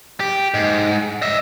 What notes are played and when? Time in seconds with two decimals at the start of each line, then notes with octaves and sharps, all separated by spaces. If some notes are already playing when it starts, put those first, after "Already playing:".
0.20 G4
0.54 G#2
1.22 D#5 E5